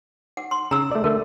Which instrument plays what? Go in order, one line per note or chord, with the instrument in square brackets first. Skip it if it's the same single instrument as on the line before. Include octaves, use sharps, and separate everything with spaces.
[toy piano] F#5
C6
[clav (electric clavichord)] C#3 [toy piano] A#5 E6
[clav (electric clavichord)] A3 D5
[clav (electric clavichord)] D3 A3 [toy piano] A#4